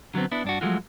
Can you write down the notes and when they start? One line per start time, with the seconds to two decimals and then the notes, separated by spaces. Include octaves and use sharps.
0.14 D3 F#3 G3 B3 C4
0.32 B3 D4 E4
0.44 G2 D4 F#4
0.61 F3 F#3 G#3 A3 F4 F#4